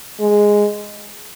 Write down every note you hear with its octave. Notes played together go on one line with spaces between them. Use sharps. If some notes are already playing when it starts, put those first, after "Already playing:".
G#3